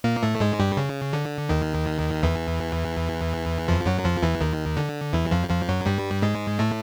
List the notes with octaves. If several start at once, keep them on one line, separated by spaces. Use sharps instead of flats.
A#2 A#3
A2 A3
G#2 G#3
G2 G3
C#3
D3
D#2 D#3
E2 E3
F2 F3
F#2 F#3
F2 F3
E2 E3
D#2 D#3
D3
E2 E3
F2 F3
F2 F3
F#2 F#3
G2 G3
G#2 G#3
A2 A3